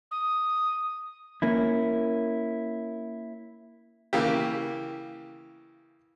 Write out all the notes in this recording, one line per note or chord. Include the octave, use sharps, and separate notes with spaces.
D#6
A#3 C#4 E4
C#3 E3 A#3 G4